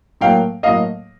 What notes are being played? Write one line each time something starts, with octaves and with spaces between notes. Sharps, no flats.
A2 F#3 A#3 F5 G5
A2 F#3 A#3 D#5 F5